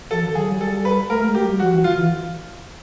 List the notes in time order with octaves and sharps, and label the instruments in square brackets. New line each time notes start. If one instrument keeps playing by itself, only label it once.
[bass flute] F3 [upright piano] A4
[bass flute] D#3
[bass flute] F#3 [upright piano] G#4
[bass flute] G3
[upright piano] A4
B4
[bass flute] A3 [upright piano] A#4
[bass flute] G#3
[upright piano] G4
[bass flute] G3
[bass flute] F3 [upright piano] F#4
[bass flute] E3
[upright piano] F4
[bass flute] D#3
E3